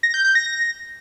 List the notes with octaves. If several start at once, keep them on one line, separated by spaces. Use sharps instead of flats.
A#6
G6
G6
A#6